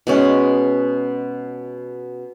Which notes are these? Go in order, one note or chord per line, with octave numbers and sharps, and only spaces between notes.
B2 G#3 C#4